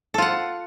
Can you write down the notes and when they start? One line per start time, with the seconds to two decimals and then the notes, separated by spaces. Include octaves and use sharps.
0.14 A4
0.18 F4
0.22 F#5